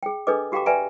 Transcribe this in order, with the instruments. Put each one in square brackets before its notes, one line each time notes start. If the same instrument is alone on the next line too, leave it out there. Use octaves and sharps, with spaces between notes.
[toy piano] G#4 G5
D4 G#4 A4 B4 D#5 D6
F#4 G4 F5 G5 A#5 D6
B4 D5 E5 G5 G#5 A#5